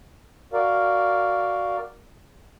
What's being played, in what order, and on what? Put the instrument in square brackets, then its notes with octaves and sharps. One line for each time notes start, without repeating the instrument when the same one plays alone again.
[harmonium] F#4 A#4 D5 F5